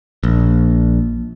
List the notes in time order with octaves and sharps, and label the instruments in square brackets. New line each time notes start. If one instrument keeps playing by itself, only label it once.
[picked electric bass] A#1